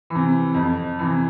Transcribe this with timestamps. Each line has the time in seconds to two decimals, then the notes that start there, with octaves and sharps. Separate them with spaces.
0.10 C3 E3
0.54 F2
0.99 C3 E3